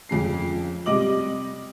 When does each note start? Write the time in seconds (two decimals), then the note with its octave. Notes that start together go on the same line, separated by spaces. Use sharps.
0.09 F2 C#3 C7
0.86 C3 G3 D#5 D6 F#7